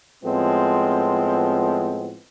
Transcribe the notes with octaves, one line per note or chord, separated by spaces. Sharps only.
A2 F3 G#3 B3 C4